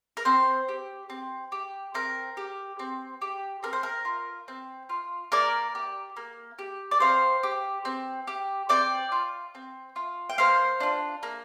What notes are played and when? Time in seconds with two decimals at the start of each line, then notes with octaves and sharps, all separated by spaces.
0.17 A#4
0.25 C4 C5
0.69 G4
1.10 C4
1.52 G4
1.94 C4 A#4
2.37 G4
2.79 C4
3.22 G4
3.63 C4 A#4
3.73 C5
3.83 A#4
4.05 F4
4.48 C4
4.89 F4
5.32 A#3 A#4 D5
5.75 G4
6.17 A#3
6.59 G4
6.91 D5
7.00 C4 C5 F5
7.43 G4
7.85 C4
8.27 G4
8.69 C4 D5 G5
9.12 F4
9.55 C4
9.96 F4
10.30 G5
10.38 A#3 C5 F5
10.80 D4 F4
11.23 A#3